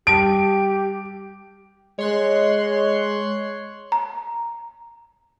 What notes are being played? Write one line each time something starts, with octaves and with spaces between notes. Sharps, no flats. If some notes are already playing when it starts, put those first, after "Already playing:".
G3 G4 A5 D#6 D7
G#3 C#5 C6 F#6
A#5